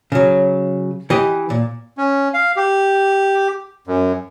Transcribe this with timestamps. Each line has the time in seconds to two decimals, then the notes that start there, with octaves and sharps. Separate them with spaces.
0.12 C#3 F#3
1.10 E3 G4 D#5
1.50 A#2
1.98 C#4
2.34 F5
2.56 G4
3.87 F#2